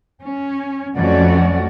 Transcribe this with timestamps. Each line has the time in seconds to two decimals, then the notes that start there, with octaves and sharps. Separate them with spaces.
0.23 C#4
0.96 F2 F#3 A3 C#4 F#4 D5